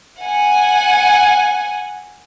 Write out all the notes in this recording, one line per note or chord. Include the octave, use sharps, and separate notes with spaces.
F#5 G#5